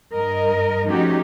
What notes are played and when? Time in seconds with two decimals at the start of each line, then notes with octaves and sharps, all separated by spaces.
0.15 G2 A#4 D#5
0.88 F3 A3 C#4 D#4 F#4 G4